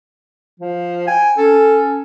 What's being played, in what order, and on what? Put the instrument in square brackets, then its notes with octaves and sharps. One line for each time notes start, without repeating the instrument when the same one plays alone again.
[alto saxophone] F3
[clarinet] G5 [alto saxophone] G#5
[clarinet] C#4 [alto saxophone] A4